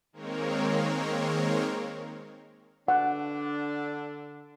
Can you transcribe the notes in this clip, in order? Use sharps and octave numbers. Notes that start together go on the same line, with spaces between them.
D#3 G#3 A#3 C4 A#4 C#5
D3 D4 F#5